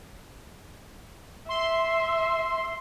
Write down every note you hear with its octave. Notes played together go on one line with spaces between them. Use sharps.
E5 C6